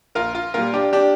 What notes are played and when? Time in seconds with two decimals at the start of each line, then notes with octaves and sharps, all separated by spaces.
0.15 A#1 F4 A#4
0.35 F4
0.54 A#2 G3 F4 A#4
0.74 D4 G4
0.93 D4 G4